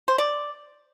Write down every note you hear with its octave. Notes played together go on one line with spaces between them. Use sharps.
C5
D5